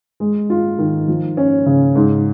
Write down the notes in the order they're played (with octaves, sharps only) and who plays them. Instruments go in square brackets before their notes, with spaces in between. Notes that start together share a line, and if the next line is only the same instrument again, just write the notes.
[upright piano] G#3
F4
D#3
F3
C#4
C#3
G#2